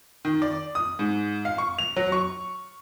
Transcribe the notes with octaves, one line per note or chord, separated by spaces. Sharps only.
D#3
D5
D#6
G#2
F5
C#6
F7
F#3
C#6